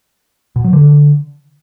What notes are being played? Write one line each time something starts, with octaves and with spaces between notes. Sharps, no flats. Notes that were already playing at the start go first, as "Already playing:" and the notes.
B2
F#3
D3